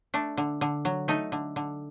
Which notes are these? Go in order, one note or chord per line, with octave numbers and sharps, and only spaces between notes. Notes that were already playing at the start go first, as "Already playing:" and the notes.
A3 D4
D3
D3
F#3
A3 D#4
D3
D3